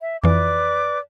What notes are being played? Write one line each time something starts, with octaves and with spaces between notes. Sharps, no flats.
E5
F2 E3 B4 D5 D6